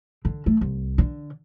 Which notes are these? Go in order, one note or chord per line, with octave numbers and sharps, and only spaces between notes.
D3
A3
C2
D3